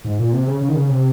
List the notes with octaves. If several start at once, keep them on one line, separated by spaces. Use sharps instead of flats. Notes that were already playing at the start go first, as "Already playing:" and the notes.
G#2
A#2
C3
C#3
C#3
D#3
C#3
C3